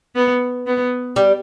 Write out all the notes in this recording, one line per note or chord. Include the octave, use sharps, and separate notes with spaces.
B3
B3
G3